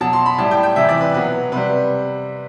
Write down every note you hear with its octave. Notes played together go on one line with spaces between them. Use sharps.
B2 F#3 A5
C6
B5
A2 G3 A5
G5
G5
C3 E3 G3 E5
D5
B4
B2 F#3 B4
C3 G3 B4